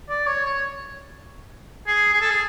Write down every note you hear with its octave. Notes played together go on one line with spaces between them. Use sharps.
D5
C#5
C#5
G#4
G#4
A4
G#4